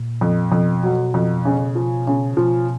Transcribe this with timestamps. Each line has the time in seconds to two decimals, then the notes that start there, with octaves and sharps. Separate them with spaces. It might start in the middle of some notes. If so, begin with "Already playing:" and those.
Already playing: A#2
0.21 F2
0.52 F2 B2
0.83 F#3
1.14 F2
1.45 C#3
1.75 F3
2.07 C#3
2.37 B2 F3